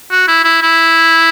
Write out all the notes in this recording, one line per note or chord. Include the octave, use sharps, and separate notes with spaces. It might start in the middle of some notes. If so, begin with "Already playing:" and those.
F#4
E4
E4
E4